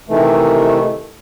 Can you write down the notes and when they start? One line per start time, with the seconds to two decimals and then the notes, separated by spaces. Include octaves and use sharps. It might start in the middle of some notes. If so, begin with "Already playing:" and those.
0.09 C3 D#3 E3 A3